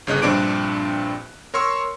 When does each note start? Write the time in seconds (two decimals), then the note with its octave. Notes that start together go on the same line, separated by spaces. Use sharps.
0.07 G1 C#3 D#5 F#6
0.22 A#1 G2 C4 D4 D6 D7
1.54 A#4 C#5 C6 C#6 E6